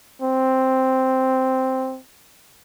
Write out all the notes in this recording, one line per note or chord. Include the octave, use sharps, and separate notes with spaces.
C4